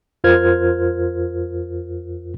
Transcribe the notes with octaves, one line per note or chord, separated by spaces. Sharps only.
F2 F4 A#4 C5 F6 G#6